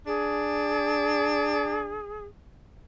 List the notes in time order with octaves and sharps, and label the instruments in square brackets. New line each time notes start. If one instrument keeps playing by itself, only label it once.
[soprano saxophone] D4 [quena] G#4